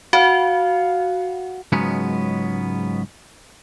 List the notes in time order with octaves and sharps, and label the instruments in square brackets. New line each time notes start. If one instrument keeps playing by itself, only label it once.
[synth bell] F#4 [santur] F5 F#5
[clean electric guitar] C#2 G#2 F#3 G#3 B3 C#4